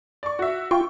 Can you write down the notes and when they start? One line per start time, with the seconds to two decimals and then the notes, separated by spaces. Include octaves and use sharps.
0.23 D5 C#6
0.39 F#4 E5
0.71 F4 G5 C#6